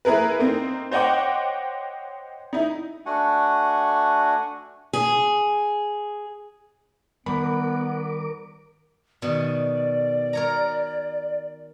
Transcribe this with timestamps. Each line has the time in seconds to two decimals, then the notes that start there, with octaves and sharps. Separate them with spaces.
0.05 A#3 E4 G#4 A#4 B4
0.39 A#3 C4 D#4
0.91 C5 C#5 D#5 F#5 G5 D6
2.53 D#4 E4
3.06 A3 D4 F#4 F#5 G#5
4.93 G#4
7.26 D#3 G3 B3 A#4 B5 D6
9.22 B2 D#3 D5
10.33 A#4 C#5 A#5